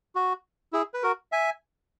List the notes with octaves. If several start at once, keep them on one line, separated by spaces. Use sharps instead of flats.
F#4
E4 G#4
B4
F#4 A#4
E5 G#5